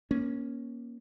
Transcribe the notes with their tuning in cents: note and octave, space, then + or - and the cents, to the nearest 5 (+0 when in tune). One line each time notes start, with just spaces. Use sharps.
A#3 +25 C#4 +0